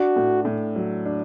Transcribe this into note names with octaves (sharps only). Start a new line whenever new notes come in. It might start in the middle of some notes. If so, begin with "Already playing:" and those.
Already playing: D4 F#4
A2
A2
F#3
D4